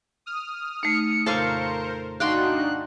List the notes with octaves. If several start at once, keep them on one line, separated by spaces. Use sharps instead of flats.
D#6 F6
A3 D#4 C#7
F2 A#2 C#3 A4 A#4 C5 F5 C#6
D4 D#4 F#4 F5 G5 C6 F#6